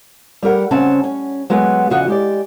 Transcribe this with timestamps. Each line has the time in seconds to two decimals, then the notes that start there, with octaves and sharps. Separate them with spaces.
0.43 G3 G4 A#4 F#5
0.71 C#3 C4 C#4 F#5 A5
1.04 C#4
1.50 F#3 G#3 B3 F#4
1.90 E2 C#3 F3 F#4 D#5
2.07 G#3 G4 D5